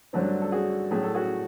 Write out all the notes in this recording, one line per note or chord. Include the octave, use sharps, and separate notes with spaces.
G2 D3 F#3 A3 C4
A4
F#4 G#4
A2 F#3 A3 G#4
A4
F#4 G#4